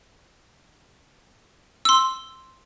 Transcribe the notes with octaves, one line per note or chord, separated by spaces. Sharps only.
C6 E6